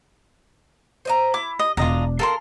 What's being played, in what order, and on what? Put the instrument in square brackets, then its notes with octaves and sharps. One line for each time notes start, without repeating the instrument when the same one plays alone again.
[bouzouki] C5 D#5 A#5
[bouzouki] E4 [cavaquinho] D6
[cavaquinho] D#5
[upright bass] E1 [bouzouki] D4 [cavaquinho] F4 D#5 A#5
[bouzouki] F4 A5 [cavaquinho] A4 A#4 C6